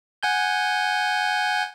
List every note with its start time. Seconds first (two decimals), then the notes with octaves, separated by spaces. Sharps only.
0.23 F#5 G#5 G6